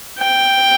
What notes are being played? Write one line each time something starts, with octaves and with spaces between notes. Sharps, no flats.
G5